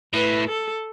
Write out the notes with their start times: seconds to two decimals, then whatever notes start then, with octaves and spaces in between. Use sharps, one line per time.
0.13 A2 B4
0.48 A4